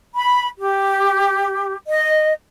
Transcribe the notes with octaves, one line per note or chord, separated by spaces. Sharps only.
B5
G4
D#5